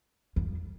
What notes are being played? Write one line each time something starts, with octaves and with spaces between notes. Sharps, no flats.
F2